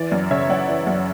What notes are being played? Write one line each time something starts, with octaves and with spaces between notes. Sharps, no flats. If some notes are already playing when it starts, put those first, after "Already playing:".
Already playing: E3 D5
F#2
C#3 C#5 E5
F#2 D5 F#5
E3
F#2